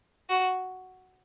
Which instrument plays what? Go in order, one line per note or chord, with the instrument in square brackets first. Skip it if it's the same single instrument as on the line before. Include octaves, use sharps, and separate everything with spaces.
[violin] F#4